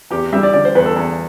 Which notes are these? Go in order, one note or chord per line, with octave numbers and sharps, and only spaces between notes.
E2 G4
G3 E5
D5
D3 D5
C5
E2 B4
A4
E2